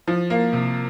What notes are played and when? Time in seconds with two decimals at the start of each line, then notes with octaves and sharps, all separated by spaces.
0.07 F3
0.30 A#3
0.53 C3